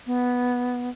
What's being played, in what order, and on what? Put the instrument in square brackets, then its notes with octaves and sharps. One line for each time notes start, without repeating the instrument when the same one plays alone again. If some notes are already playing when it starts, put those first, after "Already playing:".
[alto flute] B3